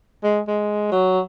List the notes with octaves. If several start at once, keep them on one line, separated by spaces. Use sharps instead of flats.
G#3
G#3
F#3